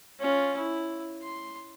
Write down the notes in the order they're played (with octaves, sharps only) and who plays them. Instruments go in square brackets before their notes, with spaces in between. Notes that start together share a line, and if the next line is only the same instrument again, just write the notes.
[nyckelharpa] C#4 F4
E4
C6